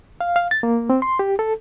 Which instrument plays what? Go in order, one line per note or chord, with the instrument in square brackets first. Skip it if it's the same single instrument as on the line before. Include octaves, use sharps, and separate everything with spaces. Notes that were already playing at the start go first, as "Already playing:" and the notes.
[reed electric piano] F5
F5
A6
A#3
C4
C6
G4
A4